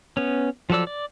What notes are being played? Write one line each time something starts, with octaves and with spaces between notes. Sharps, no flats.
B3 C#4
F3 F#3 A4 D5 E6
D5